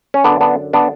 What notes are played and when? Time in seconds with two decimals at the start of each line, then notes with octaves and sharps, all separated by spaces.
0.14 C#4
0.24 F#2 D3 B3 D4
0.41 B3 D4
0.73 B3 D4